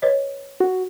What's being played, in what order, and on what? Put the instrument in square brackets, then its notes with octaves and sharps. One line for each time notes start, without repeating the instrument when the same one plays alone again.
[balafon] B4 C#5 D#5
[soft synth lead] F#4